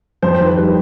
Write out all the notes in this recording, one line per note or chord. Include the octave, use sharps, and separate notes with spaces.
F2 C5
C5
D#3
B4
G3 B4